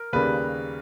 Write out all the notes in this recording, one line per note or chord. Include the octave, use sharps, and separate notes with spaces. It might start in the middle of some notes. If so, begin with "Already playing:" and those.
Already playing: A#4
D#2 C#3 G3 A#3 B4